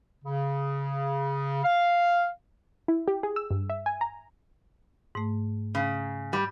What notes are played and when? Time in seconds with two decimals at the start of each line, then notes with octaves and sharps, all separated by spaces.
0.24 C#3
1.64 F5
2.88 E4
3.08 G4
3.23 G#4
3.36 E6
3.50 G2
3.70 E5
3.86 G#5
4.01 A#5
5.15 G#2 A3
5.75 C#3
6.33 G3